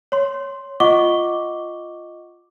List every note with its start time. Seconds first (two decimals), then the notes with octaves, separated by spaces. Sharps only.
0.12 C#5 C6
0.80 F4 D#5 F#5 C#6 D6 G7